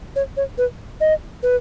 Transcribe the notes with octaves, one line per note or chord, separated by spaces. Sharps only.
C#5
C#5
B4
D#5
B4